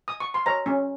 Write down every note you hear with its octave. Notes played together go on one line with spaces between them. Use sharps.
D#6
C#6
C6
C#5 A#5
C#4